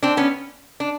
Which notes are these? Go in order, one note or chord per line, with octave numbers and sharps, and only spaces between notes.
C4 D4
B3 C#4
D4